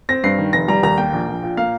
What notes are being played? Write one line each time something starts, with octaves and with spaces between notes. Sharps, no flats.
C4 A#6
G2 C7
D#3
F1 A#6
G3 A#5
D#2 A#5
A#3 G5
A#1
A#1
A#2
A#3 F5